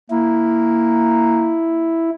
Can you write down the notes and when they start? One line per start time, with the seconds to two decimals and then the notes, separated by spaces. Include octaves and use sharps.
0.10 A#3 E4